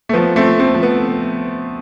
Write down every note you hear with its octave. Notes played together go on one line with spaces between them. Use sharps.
A3
F3 B3
A3 C4
F3
A3 C4
F3
B3